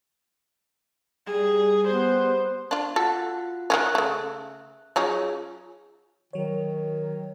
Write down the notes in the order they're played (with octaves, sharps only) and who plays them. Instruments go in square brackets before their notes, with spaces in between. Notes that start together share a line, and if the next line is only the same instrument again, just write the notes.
[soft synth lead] G3 [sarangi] G#4
[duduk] B3 [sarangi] C5
[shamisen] D4 F4
[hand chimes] F4 F#4 F#5 [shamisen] A4
[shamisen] D#3 E3 C#4 [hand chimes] E5 F#6
[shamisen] C#3 A3
[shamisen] F#3 C#4 D#4 [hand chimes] F4 G#4 C#5
[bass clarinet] D#3 [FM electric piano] F#3 C#5